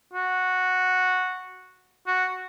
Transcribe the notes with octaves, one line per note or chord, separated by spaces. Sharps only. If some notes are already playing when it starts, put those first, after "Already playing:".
F#4
F#4